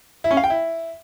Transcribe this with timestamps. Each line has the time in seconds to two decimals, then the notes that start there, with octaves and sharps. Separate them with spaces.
0.24 E4
0.31 C#4
0.37 F5
0.44 G5
0.50 E4